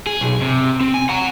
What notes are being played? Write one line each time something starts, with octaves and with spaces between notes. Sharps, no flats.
G#4
B1
C3
C4
G#5
F#5 A#5